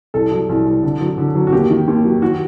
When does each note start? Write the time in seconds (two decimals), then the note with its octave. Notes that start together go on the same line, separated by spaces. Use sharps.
0.14 C2 A4
0.32 F#3
0.49 C2
0.66 C2
0.83 D3
1.01 F#3
1.18 D3
1.35 F#3
1.47 F#4
1.52 D#2 G4
1.70 D#3
1.87 D#2
2.05 F#3
2.22 D#3 F#4